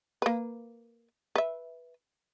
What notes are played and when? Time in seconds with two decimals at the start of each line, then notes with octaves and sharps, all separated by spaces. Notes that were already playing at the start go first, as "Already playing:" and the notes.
0.22 A#3 B4
1.36 B4 E5